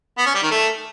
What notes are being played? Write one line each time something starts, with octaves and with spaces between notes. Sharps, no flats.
B3
C#4
G3
D#3
A3